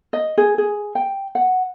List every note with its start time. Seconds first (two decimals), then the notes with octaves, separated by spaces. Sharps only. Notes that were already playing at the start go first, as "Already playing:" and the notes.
0.13 D#5
0.38 G#4
0.58 G#4
0.95 G5
1.35 F#5